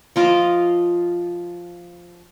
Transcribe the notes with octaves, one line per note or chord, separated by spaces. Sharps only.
F3 F4 D#5 D6